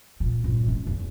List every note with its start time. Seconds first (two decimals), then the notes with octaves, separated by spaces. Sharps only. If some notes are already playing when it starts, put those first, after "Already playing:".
0.20 A#2 B3
0.44 G2 A#2
0.66 G#3 C#4
0.87 E2